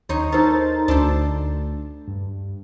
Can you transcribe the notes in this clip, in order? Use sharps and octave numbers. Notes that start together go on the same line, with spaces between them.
D#2 D#4 C5 C#5
D#4 A4 A#4 C5 A6
D2 D4 A4 C5
G2